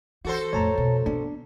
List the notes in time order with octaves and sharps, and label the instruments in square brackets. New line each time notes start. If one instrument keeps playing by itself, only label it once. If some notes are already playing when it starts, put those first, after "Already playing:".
[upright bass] E3 [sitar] F#4 A4 C5
[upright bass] F2 A2 [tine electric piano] C#5 A5 A#5
[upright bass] F2 B2
[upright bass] B3 C#4 [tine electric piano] D4